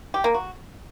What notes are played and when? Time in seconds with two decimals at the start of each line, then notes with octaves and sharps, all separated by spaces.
0.14 G4
0.24 A#3
0.34 F#4